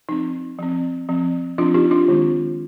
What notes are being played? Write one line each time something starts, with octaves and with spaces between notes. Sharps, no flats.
F3 C4 D#4
F3 C4
F3 C4
F3 C4 D4 F4
D#4 G4
D4 F4
D#3 G#3 C4